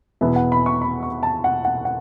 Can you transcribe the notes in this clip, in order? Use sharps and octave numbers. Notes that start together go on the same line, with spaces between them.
E2 B2 B3 E4 E5
F#5
B5
C#6
B5
C#6
A5
F#5
F#5
F#5